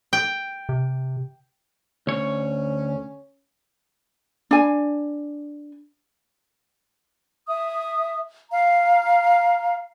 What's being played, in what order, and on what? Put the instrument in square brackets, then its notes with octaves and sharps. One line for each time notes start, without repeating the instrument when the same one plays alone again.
[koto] G5
[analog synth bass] C3
[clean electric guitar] D2 C#5 [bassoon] C#4
[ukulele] D4 G#5
[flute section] E5 D#6
F5 A#5